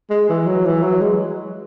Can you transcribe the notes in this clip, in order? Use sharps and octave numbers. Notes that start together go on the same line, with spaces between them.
G#3
E3
F#3
E3
F#3
G#3